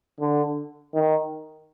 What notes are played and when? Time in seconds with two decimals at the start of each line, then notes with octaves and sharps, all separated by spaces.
0.21 D3
0.94 D#3